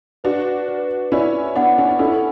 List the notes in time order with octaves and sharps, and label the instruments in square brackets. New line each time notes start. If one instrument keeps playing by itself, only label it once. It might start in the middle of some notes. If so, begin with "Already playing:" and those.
[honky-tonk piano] D4 F#4 [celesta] B4
[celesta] B4
[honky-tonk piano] C#4 E4 [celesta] D5
[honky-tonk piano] B3 D4 [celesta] F#5
[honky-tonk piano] C#4
D4
[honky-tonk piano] C#4 E4 [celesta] A4